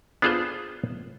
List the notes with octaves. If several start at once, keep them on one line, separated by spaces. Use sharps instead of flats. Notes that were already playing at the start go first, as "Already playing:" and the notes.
B3 D4 F4 G#4 A4 C5